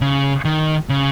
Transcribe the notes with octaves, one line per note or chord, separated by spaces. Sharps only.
C#3
D#3
C#3